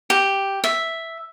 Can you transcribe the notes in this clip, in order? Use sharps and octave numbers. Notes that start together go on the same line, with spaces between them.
G4
E5